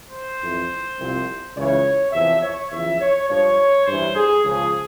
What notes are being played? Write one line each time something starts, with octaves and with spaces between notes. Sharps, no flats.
C5
F2 E3
C2 C3 F3
C#2 C#3 E3 C#5
E2 C3 F3 E5
C#5
E2 C#3 F3 E5
C#5
G2 F3 C#5
G2 E3 C5
G#4
C#2 C#3 F3 G#4